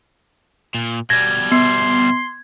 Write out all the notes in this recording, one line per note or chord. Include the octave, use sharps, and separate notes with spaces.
A#2
B2 G3 G#6 A#6
B3 C6